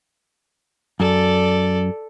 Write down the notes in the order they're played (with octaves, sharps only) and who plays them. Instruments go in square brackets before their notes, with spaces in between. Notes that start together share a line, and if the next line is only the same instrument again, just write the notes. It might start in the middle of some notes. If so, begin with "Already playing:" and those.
[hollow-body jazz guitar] F#2 [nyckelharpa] A4 D5